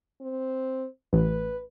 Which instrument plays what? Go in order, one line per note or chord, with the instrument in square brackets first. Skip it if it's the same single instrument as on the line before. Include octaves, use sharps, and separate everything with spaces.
[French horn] C4
[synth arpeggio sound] A1 [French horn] B4